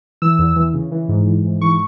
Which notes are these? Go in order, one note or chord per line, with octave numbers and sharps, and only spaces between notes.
E3 E6
E2
E3
C#3
E3
G#2
E3
G#2
E3 C#6